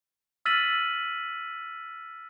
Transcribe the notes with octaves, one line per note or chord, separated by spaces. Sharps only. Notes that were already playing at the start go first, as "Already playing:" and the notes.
E6 F6 A6 B6 D#7 F#7